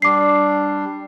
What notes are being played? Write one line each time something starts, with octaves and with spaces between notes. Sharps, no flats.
G3 D4 D6 C7